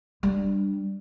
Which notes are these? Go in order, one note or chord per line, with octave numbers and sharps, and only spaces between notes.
G3 D4